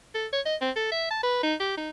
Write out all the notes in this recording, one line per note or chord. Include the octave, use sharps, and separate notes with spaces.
A4
C#5
D#5
C4
A4
E5
A5
B4
D#4
G4
D#4